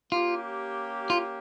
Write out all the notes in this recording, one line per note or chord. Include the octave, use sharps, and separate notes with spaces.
A#3 C#4 F4 G4
F4